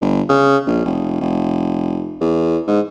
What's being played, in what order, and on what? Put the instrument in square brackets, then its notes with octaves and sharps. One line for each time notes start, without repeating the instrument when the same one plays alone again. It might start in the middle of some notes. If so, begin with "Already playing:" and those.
[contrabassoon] G1
C#3
A#1
F1
F1
E2
G#2